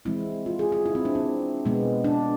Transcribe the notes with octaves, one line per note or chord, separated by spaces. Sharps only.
E3 G#3 C4 E4
F4
G#4
G#4
E4
C4
D4
C4
B2 G#3 B3
D4